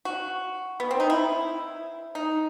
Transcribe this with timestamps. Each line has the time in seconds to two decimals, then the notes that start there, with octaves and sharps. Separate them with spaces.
0.05 F#4
0.80 B3
0.91 C4
1.00 D#4
1.10 E4
2.15 D#4